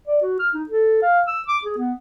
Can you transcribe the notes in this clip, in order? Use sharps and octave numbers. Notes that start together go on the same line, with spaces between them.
D5
F#4
F6
D#4
A4
F5
E6
D6
G#4
B3